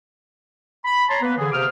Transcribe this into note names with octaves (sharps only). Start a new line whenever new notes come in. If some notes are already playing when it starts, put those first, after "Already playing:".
B5
C#5 A5 A#5 C6
A#3 B3 B4
D3 E3 G#4
C3 A#3 C5 D6 D#6 F6